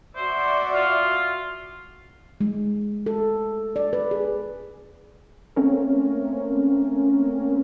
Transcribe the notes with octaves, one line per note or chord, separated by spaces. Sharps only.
F#4 C5 D5 E5
F4
G#3
A4
D5
B4
G#4
A3 A#3 C4 C#4 A#4